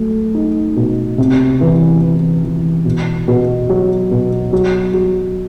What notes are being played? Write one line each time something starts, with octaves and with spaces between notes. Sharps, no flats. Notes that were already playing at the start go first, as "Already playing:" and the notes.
Already playing: F#3 A3
D#4
B2
C3
E3
E3
E3
B2
B2
F#3
B2
F#3
F#3